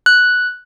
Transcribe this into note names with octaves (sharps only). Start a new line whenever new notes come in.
F#6